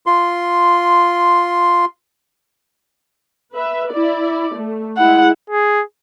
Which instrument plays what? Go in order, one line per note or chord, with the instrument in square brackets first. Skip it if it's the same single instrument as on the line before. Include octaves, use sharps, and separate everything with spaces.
[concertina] F4 C6
[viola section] B4 E5
E4 D5
A3
[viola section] G#3 E4 [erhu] F#5
[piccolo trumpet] G#4